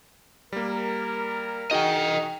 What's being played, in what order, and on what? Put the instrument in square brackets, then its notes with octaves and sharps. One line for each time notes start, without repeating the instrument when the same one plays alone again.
[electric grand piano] G3 A#3 [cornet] A#4
[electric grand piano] D#4 F#4 G#4 [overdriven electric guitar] D#5 G5